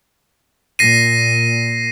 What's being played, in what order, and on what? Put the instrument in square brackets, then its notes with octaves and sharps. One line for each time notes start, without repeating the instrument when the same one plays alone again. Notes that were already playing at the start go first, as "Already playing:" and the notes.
[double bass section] A#2 [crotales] A#6 C7 D#7